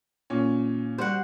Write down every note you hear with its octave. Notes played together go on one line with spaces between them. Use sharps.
A#2 C#4
G3 F#4 C5 F#5